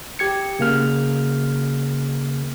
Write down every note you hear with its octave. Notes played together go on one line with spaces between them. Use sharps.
G4 G#6 C#7
C#3 A#3 F6